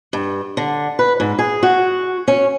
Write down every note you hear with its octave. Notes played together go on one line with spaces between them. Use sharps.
G2
D3
B4
G#2
G#4
F#4
C#4